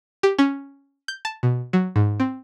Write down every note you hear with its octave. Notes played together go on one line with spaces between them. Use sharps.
G4
C#4
G6
A5
B2
F#3
G#2
C4